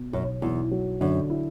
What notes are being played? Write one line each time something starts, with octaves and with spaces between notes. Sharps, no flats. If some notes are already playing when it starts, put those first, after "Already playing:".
Already playing: B2
B1 F#2
B1 E2
F#3
F#2 D3
E4